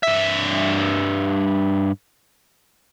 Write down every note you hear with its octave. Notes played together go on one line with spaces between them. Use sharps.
G2 E5